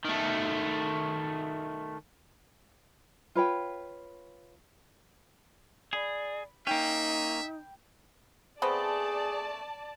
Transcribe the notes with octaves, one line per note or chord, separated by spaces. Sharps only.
D#3 A3
F4 B4 C#5 G5
G#4 D5 B5
A#3 C#4 D#4 E5 G5
A3 B3 C4 G#4 D5 A5